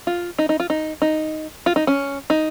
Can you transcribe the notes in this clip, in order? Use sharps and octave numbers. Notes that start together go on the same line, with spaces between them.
F4
D#4
D#4
F4
D#4
D#4
F4
D#4
C#4
D#4